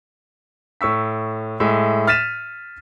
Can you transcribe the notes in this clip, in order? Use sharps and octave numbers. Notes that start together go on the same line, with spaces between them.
A2 C#6 E6 B6
A2 G#3 E5
F6 A6 B6 D#7 E7